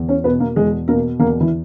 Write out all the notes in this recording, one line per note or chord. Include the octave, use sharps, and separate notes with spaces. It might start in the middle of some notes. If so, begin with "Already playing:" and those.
Already playing: E2
C#4 C#5
B2 B3 B4
A#3 A#4
E2 G#3 G#4
B2 A#3 A#4
E2 A#3 A#4
E3 E4